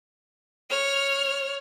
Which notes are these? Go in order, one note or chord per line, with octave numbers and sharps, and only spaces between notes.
C#5 F6